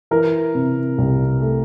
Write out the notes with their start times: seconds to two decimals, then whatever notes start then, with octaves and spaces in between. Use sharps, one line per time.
0.11 E3 A#4
0.55 C3
0.98 C2
1.41 A3